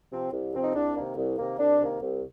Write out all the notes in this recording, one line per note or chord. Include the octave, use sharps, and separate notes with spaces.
C3 F3 C4
C2
C3 F3 C4
D#4
C2 D4
C3 D#3 A#3
C2
C3 D#3 A#3
C2 D4
C3 D#3 A#3
C2